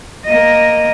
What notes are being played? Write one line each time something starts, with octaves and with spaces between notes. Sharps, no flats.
A#3 D#5